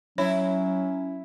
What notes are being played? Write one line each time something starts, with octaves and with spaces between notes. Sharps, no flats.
F#3 C#4 E4 C#5